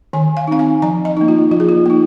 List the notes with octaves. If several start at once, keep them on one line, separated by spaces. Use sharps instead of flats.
D#3 G#5
F5
C4 D#4 F5
G#5
F3 A#5
D#5
A#3 D#4
F4
F3 F4
G#4
F4
A#3 D#4